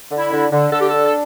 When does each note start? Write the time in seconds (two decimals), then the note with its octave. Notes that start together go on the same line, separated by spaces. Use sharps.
0.11 D3
0.18 E4
0.32 D3
0.52 D3
0.72 D3 A4
0.81 G4
0.89 D4 A4
1.06 A4